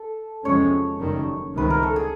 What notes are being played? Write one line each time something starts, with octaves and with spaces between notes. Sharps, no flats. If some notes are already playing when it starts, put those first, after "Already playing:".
Already playing: A4
E2 C3 F3 G#3 C#4 C#5
F#1 F#2 D#3 G3
C#2 C3 D#3 G3 C4 B4
A#4
A4
G#4